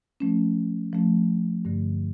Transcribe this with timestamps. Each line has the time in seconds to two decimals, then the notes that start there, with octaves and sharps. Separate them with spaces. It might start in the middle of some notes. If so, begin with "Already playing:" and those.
0.20 F3 A3 C#4
0.93 F3 A3 C#4
1.65 G2 D3 A3